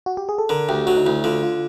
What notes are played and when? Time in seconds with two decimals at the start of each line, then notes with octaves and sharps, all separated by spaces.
0.06 F#4
0.17 G4
0.29 G#4
0.38 A4
0.49 D3 A#4
0.69 D2 G4
0.87 F#3 F#4
0.97 D#4
1.05 D2 E4
1.24 D3 F4
1.43 F4